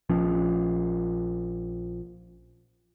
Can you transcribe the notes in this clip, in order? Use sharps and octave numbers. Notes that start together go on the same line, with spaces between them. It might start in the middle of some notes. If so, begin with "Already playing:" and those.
A#1 F3 C#4